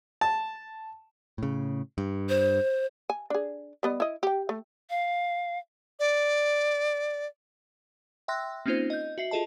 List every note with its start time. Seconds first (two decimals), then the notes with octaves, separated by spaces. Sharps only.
0.21 A5
1.38 A2 C#3
1.98 G2
2.29 C5
3.10 G#5
3.30 D4 G#4
3.83 G3 B3 D#5
4.00 E4 D#5
4.23 G4 G5
4.49 A3
4.90 F5
5.99 D5
8.28 E5 G5 C6 E6 F#6 A#6
8.66 A#3 C4 C#4 D#4 F4 C5
8.90 D#5 G6
9.18 F#4 E5 C7 F#7
9.31 F4 G#4 A4 D#5 A5